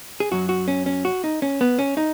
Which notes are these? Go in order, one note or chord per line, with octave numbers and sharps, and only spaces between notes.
G#4
F#2 F#3 F#4
F#4
C#4
C#4
F#4
D#4
C#4
B3
C#4
D#4